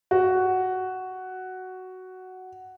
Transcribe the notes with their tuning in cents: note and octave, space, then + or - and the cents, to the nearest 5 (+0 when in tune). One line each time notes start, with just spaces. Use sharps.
F#4 +5